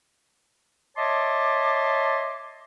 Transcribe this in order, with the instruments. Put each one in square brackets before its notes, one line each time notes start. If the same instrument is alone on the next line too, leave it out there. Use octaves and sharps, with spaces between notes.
[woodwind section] C#5 D#5 E5 A5 C6 D6